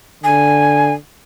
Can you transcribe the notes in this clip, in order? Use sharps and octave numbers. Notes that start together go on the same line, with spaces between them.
D3 G#5